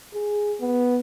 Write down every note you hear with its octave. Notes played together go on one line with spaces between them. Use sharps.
G#4
B3